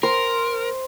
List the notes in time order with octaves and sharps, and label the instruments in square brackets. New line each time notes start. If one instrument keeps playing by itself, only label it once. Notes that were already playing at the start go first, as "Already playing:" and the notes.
[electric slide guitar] A#4 [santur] C5